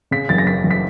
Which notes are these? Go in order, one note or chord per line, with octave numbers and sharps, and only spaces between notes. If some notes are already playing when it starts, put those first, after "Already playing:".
C#3 B6
F#1 A6
A#6
F#1 B6
F#1
B6